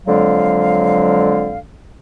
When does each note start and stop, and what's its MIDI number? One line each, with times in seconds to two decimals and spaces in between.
0.06 1.58 41
0.06 1.58 50
0.06 1.58 54
0.06 1.58 56
0.06 1.58 77